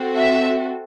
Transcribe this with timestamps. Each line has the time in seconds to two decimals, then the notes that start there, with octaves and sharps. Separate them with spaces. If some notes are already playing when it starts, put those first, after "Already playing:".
Already playing: C4 F#4 A4
0.17 E5